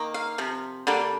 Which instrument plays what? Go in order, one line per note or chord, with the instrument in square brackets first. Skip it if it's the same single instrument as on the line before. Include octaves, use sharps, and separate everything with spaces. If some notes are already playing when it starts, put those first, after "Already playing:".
Already playing: [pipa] D#3 A#3
F5
C3 F3
D3 G3 A#3